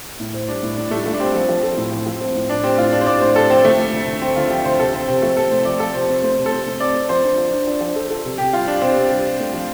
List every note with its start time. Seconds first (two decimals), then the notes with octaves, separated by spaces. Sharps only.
0.20 A2
0.34 C5
0.48 G3 D4
0.63 A2
0.77 A2 D4
0.91 G3 A3
1.06 A3 F4
1.14 D4
1.20 G3 C4
1.34 F3
1.49 F3
1.63 A4
1.77 A2
1.92 F3
2.06 F3
2.21 C4
2.35 A2
2.49 A2 D4
2.63 C4 G4
2.78 A2 F4
2.92 D4 G4
3.01 C5
3.06 A2 D5
3.21 A2 C5
3.36 G4 A4
3.50 F3 C4
3.64 D2 A3
3.79 D3
3.94 D2
4.08 D2
4.22 D2 C4
4.36 D3 F4
4.50 F3 G4
4.65 D2 C5
4.79 C3 A4
4.94 C3 C4
5.08 C3 C4
5.22 F3 A3
5.37 C3 A4
5.51 A3 C5
5.65 F3 D5
5.80 F3 A4
5.94 C3 C5
6.09 C4
6.23 A3 C5
6.38 C3
6.46 A4
6.52 C3 C5
6.67 A3
6.80 C4 D5
6.95 C4
7.09 F3 C5
7.24 D4
7.38 F3
7.52 D4
7.67 D4
7.81 F3
7.96 A4
8.10 A4
8.24 C3
8.38 C3 G4
8.53 G3 F4
8.67 D4 G4
8.77 D4
8.82 C3 C4
8.96 C3
9.11 G3
9.25 G3
9.39 A3
9.54 F3